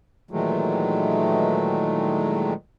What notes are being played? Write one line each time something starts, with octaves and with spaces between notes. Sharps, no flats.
A#2 D#3 E3 F#3 G#3 A3